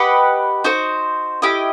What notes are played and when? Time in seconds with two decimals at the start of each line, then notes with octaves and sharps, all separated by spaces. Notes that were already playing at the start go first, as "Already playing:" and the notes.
Already playing: G4 B4 D#5 F#5
0.64 D#4 F#4 C5
1.42 E4 G4 D#5